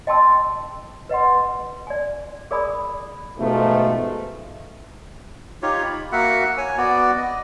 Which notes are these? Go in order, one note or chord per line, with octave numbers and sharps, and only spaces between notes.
D#5 G5 A5 C6 E6
B4 D#5 F#5 C6
D5 G#5
G#4 A#4 D5 G#5 B5 D#6
G#2 B2 F3 A3
D#4 F4 G4 C#5
B5
A#3 F#4 E5 F#5
C#5 G#5
B3 F#4 D5
D#5